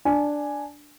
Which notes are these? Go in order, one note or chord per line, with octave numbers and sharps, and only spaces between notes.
D4 G#5